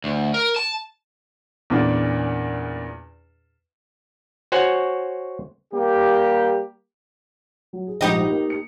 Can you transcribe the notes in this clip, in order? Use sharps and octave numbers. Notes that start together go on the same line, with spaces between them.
D2
A#4
A5
E2 A#2 C#3 A#3 D4
F#4 C5 C#5 F#5 G#5
G3 A#3 G4
F#3
G#4
A#1 G#2 D#4 G4 D#5
A#3
C#7